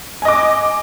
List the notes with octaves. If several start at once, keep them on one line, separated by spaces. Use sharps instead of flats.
D#5 G#5 D6